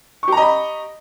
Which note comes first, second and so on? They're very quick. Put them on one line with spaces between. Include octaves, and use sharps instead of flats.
C#6 G4 A#5 D#5 B5